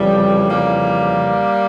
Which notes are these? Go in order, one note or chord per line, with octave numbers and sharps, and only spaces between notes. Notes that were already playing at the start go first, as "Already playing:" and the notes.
Already playing: F2 C#3 E3 G3
G3 A#3